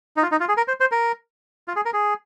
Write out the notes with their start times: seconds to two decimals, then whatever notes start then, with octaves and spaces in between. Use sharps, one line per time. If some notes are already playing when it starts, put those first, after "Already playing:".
0.17 D#4
0.22 F4
0.32 D#4
0.40 F4
0.48 G#4
0.57 A#4
0.68 C5
0.80 C5
0.92 A#4
1.68 F4
1.76 G#4
1.86 A#4
1.93 G#4